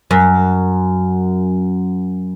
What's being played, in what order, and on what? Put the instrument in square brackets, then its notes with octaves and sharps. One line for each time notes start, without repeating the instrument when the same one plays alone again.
[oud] F#2